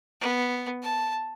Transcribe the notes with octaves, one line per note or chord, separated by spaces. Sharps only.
B3
A5